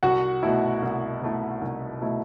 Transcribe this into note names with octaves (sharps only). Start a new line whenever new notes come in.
C2 F#4 F#5
B2 A3 E4
C2
B2 A3 E4
C2
B2 A3 E4